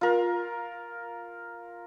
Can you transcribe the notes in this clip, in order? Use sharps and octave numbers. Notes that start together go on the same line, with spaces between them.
F4 A#4